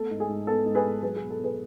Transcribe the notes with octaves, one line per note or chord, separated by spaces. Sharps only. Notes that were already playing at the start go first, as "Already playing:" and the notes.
Already playing: A3 B3 A4
G#2
G#4
G#2
B3 A4
G#2
G#4 B4
G#2
F#3 G#4 B4
G#4
B2
A4
B2 G#4 B4